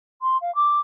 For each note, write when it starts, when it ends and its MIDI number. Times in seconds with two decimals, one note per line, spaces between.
0.22 0.37 84
0.41 0.54 77
0.55 0.79 86